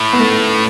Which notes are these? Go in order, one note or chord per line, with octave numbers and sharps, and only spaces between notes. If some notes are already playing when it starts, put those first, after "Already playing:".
Already playing: A2
B3
A3